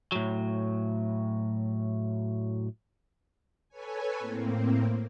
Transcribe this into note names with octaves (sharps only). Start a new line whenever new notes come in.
A2 F#3
A4 B4 C#5 G#5
A2 A#3 C4